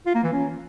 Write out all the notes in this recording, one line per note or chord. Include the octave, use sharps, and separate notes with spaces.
F4
A#3
E3
C#4